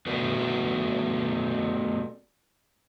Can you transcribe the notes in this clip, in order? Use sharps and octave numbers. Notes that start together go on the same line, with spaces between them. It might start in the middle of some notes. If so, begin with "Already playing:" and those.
A3 B3 D4 F#4 B4